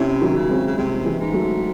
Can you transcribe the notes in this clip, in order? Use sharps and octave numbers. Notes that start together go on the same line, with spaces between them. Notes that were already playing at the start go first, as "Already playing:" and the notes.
Already playing: C3 C#4 E4
D#3 F#3
C#3
G#3 C4
C#3
C3 G#3 C4
E3 G#3
G#2
F#3 A3